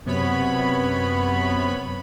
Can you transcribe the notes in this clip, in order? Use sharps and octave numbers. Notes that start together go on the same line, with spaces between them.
F#2 C3 B3 C#5 B5